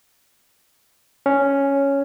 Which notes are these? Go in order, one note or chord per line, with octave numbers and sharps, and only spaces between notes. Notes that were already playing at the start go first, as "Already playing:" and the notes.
C#4